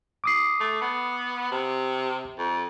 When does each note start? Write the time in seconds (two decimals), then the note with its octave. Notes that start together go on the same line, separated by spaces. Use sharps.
0.24 D6 D#6 C7
0.60 A3
0.81 B3
1.51 C3
2.38 F2